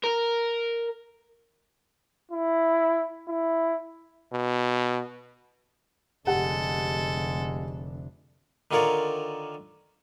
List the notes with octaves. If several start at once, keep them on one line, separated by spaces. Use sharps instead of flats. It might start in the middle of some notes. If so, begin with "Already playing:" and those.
A#4
E4
E4
B2
F1 D3 G#3 G4 A4 F#5
D3 D#3 F4 A#4 C#5 D5